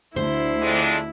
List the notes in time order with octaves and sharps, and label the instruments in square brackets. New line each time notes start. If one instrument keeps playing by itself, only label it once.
[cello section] D2 D3 [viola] E4 [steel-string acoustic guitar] C5
[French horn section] F2 G#3 D4